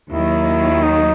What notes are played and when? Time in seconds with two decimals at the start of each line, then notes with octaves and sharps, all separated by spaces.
0.12 D#2 D#3 F#3 E4
0.83 D#4